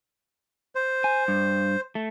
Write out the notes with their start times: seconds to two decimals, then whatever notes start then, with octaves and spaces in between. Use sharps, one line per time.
0.75 C5
1.04 G#5
1.28 G2
1.95 A3